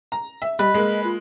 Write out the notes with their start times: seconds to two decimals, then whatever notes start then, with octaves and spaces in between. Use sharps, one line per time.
0.12 A#5
0.42 E5
0.59 G3 B4 D#5 B5
0.74 G#3 A#3
1.04 F4